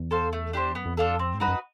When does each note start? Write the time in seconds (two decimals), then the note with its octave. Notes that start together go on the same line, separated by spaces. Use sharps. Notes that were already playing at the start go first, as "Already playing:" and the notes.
Already playing: E2
0.11 A4 C5 F5
0.33 A3
0.53 D4 G4 C5
0.75 F#2 B3
0.86 F2
0.96 E2 D4 F4 A4
1.06 F2
1.19 C4
1.34 G#2
1.40 G2 D#4 F#4 B4
1.48 F#2